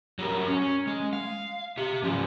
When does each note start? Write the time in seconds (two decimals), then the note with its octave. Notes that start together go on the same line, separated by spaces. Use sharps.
0.19 F#3 G3 A#4
0.48 C#4
0.87 G#3
1.13 F5
1.78 G4 E5
2.02 G#2 F3 C#4 D5